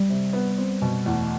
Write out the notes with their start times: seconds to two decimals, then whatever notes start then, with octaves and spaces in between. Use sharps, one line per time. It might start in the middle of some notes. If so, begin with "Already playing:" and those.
Already playing: G3
0.09 C3
0.33 B3
0.58 C4
0.82 B2
1.06 E2 A3